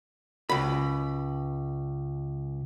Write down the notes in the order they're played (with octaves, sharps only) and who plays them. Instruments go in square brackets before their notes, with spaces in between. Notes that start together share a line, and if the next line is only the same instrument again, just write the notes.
[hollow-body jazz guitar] C#2 B5